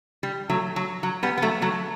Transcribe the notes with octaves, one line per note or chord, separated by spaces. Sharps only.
G3
F#3 A3
F#3
F#3
G3 B3
B3
F#3 A3
F#3 A3